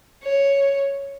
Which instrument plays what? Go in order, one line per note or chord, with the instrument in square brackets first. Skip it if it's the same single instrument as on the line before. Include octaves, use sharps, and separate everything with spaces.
[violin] C#5